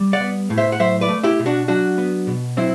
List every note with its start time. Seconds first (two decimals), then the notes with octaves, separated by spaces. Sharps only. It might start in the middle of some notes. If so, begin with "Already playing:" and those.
Already playing: G3
0.13 D5 F#5
0.21 B3
0.50 A2
0.58 C5 E5
0.72 F#5
0.79 F#3 C5 E5
1.01 B4 D5
1.09 A3
1.23 E4 G4
1.39 B2
1.46 D4 F#4
1.68 F#3 D4 F#4
1.98 B3
2.27 B2
2.57 F#3 C4 E4